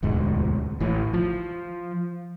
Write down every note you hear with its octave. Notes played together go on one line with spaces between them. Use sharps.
E1 D2 G#2
A1 E3
F3